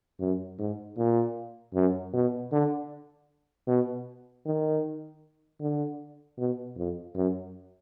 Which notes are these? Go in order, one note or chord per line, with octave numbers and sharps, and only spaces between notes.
F#2
G#2
A#2
F#2
B2
D3
B2
D#3
D3
B2
F2
F#2